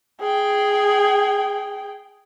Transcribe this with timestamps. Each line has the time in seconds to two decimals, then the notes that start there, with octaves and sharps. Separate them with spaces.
0.21 G#4 G5